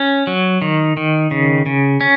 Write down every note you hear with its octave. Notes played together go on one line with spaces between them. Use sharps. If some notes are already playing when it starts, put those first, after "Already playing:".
Already playing: C#4
F#3
D#3
D#3
C#3
C#3
C#4